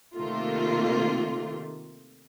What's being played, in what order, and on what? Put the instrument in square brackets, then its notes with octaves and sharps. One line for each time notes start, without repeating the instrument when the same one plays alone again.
[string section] C3 D#3 A3 A#3 F4